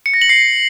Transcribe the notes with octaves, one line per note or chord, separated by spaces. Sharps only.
C#7
A#6
F#7
C7